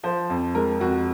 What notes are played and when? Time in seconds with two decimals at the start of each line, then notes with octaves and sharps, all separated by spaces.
0.04 F3 C5
0.30 F2
0.55 G#3 A#4
0.80 F2 F#4